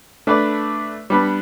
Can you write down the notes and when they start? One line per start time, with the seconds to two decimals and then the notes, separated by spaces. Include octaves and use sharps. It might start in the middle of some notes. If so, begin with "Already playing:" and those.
0.27 A3 D4 B4 D5
1.10 G3 B3 D4 B4